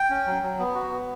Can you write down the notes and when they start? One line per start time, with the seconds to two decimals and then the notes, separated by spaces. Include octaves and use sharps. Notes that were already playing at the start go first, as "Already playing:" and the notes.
Already playing: G5
0.10 C#4
0.26 F#3
0.42 F#3
0.59 B3
0.75 F#4
0.91 B3